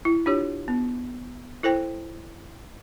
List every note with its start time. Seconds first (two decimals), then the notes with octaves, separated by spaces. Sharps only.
0.05 E4
0.26 D4 F4 G4 C#5
0.68 B3
1.63 E4 A4 C5 G5